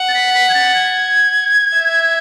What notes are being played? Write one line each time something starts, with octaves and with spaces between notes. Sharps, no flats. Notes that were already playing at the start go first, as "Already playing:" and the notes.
Already playing: F#5
A6
B6
B6
G#6
A6
G#6
E5